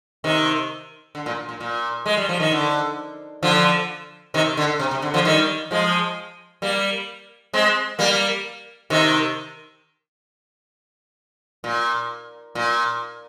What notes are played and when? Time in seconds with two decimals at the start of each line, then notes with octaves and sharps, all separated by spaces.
0.24 C3 D#3
1.15 D3
1.26 A#2
1.49 A#2
1.60 A#2
2.06 G#3
2.17 G3
2.29 F3
2.40 D#3
2.52 D3
3.43 D3 F3
4.34 C3 D#3
4.57 D3
4.79 C3
4.91 C3
5.02 D3
5.14 D3 F3
5.25 D#3 G3
5.71 F3 G#3
6.62 G3 A#3
7.53 G#3 C4
7.99 G3 A#3
8.90 C3 D#3
11.64 A#2
12.55 A#2